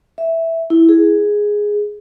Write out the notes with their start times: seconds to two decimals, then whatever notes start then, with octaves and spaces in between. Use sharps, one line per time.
0.18 E5
0.70 E4
0.89 G#4